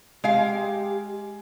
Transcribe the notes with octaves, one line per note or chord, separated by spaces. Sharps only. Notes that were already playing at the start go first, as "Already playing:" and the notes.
G#3 G4 F5